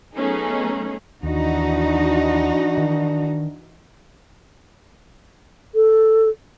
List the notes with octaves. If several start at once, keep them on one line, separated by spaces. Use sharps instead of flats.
F#3 A3 B3 C#4 D#4 G#4
D#2 E3 D4 D#4 F#4
D#3
A4